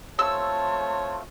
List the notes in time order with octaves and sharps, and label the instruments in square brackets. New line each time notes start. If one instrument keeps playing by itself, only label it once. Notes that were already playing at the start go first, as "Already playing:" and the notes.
[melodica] A3 C4 F4 [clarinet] C#5 [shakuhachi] A5 [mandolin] E6